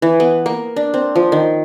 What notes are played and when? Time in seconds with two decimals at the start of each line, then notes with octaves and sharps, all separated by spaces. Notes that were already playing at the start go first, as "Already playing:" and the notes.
0.02 E3
0.20 B3
0.46 A#3
0.76 D4
0.94 C4
1.16 F3
1.32 D#3